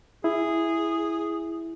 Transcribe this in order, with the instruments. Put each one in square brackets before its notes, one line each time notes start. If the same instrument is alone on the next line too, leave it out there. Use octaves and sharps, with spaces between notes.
[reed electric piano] E4 [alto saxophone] G#4